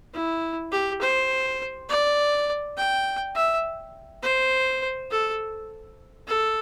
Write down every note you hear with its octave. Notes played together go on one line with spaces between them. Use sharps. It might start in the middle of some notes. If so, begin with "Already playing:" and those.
E4
G4
C5
D5
G5
E5
C5
A4
A4